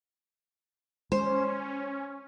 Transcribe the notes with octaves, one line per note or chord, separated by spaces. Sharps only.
G#3 C#4 C5